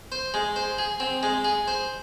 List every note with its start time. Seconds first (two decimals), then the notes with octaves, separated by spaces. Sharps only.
0.12 C5
0.34 G#3
0.56 C5
0.78 G#4
1.00 C4
1.23 G#3
1.44 G#4
1.68 C5